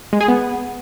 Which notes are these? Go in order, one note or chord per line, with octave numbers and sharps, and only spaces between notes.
G#3
G#4
B3